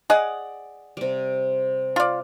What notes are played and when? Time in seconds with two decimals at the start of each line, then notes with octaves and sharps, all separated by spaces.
0.10 G#4 D5 D#5 F#5
0.97 C3 G3
1.96 F4 D5